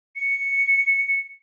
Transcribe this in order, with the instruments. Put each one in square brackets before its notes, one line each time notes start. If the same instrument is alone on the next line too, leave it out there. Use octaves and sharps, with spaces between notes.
[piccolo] C#7